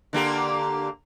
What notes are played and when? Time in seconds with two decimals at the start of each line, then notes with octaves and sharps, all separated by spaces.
0.13 D3 A#3 G4